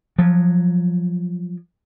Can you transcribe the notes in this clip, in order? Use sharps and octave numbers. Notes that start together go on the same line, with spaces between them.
F3 F#3